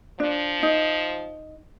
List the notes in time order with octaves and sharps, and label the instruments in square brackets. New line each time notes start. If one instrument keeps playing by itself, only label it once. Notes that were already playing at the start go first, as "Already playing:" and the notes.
[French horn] F3 [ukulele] D4
[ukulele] D#4